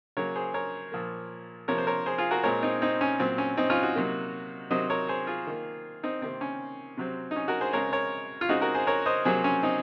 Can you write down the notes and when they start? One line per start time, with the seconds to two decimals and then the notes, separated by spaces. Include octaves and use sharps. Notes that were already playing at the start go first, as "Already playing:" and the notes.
0.17 C#3 F#3 A#3 A#4 C#5
0.36 G#4 C5
0.54 A#4 C#5
0.92 A#2 F3 A#3
1.68 C3 F3 A#3 A#4 C#5
1.78 C5
1.87 A#4 C#5
2.06 G#4 C5
2.18 F4 G#4
2.31 F#4 A#4
2.44 A#2 G#3 C4 A#4 C#5
2.62 C4 D#4
2.82 C4 D#4
3.01 C#4
3.20 A#2 F#3 C4
3.38 C#4
3.57 C4 D#4
3.70 C#4 F4
3.82 D#4 F#4
3.95 C3 F#3 A#3
4.71 C3 D#3 F#3 C4 C5 D#5
4.90 A#4 C#5
5.09 G#4 C5
5.27 F4 G#4
5.47 D#3 A#3
6.03 C4 D#4
6.22 C3 D#3 A#3 C4
6.41 C#4
6.97 C3 F#3 C4
7.31 D#4
7.36 C#4
7.48 F#4 A#4
7.61 G#4 C5
7.73 C#3 G#3 C4 A#4 C#5
7.93 A#4 C#5
8.41 F4
8.49 C#3 G#3 C4 D#4 F#4
8.62 F#4 A#4
8.75 G#4 C5
8.87 A#4 C#5
9.06 C5 D#5
9.25 C3 F#3 A#3 G#4 C5
9.44 C#4
9.63 C4 D#4